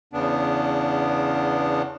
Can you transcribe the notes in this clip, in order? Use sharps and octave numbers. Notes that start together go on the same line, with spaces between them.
E2 C#3 B3 D4